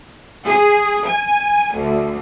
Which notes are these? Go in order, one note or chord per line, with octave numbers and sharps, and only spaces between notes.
G#4
G#5
D2